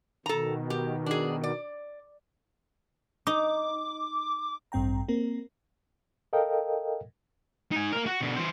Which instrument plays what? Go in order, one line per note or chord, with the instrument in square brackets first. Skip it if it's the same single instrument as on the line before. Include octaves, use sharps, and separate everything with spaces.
[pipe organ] B2 D#3 [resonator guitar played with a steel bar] A4 A#5
[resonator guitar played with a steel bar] G4
D4 G#4
D5
[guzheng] D#4 [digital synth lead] D6
[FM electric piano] A1 G2 C4 G5 A#5
A#3 C4 A#4
[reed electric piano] A4 A#4 D#5 F5 G5
[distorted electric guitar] D#4 G#5
A#3 A#4
F#4
B2 D3
E3 C5